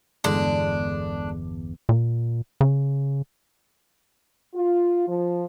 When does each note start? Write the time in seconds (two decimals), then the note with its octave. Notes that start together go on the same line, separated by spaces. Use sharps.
0.24 G1 E2 D3 G#3 D4
1.89 A#2
2.61 C#3
4.55 F4
5.08 F3